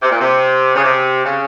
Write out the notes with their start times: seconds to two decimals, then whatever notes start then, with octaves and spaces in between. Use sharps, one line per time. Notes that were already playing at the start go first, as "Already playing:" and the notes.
0.02 C3
0.11 A#2
0.21 C3
0.75 C#3
0.84 C3
1.25 C#3